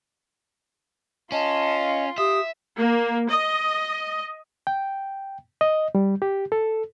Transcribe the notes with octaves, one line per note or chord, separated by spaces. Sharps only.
C#4 F4 D#5 A5 C6
F5
G4 E5 D#6
A#3
D#5
G5
D#5
G3
G4
A4